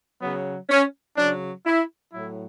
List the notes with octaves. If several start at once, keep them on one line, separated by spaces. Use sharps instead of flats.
C#3 F#3 B3
C#4
C#3 F#3 D4
E4
A2 F#3 E4